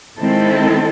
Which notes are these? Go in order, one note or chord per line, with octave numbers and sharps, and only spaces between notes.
D#3 G#3 C4 E4 A4